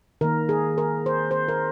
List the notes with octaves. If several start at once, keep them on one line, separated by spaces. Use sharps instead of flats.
D#3 A#3 A#4
G#4
A#4
C5
C5
A#4